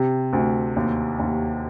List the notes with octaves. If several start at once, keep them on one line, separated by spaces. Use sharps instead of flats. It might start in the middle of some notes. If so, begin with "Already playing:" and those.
Already playing: C3
D2
D#2
D#2